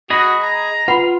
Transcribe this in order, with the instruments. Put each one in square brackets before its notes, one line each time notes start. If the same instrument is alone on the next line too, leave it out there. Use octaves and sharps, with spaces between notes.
[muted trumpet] F#4 [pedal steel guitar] G#4 D#5 B5
[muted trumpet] A#5
[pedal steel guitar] F4 [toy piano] B4 F#5 B5